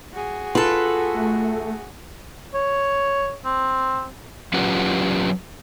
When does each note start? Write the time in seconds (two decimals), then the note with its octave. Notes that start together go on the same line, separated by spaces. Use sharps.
0.14 F#4 G#4
0.55 F4 A4 B4
1.14 A3
2.54 C#5
3.45 C4
4.54 F#3 C#4 F4 G4 B4 F#5